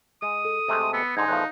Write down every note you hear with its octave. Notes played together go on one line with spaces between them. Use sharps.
G#3 D#6
A4
C3 G#3 A3
B3 E6 C#7
G#2 D3 D#4 G#5 C6 G#6
E2 A2 F3 F5 F#6